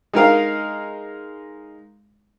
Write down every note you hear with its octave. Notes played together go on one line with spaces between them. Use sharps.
G#3 D#4 A#4 F5